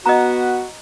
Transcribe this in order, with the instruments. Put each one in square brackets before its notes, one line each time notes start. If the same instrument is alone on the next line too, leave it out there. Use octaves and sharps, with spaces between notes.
[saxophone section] B3 F#4 [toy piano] D#5 A#5